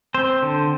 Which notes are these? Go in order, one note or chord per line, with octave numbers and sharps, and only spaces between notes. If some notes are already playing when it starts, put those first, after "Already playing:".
C4 C5
D3